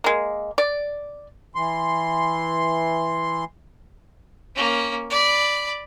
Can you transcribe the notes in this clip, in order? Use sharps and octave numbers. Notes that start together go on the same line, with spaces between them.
G#3 A#3
D5
E3 C6
A#3 C#4
D5 B5